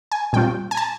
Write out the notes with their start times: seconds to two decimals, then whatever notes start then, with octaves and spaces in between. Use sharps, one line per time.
0.11 G#5
0.33 A#2 G3 C4 F4 G5
0.71 G#5
0.77 A5